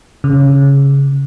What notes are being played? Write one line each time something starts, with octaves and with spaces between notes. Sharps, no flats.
C#3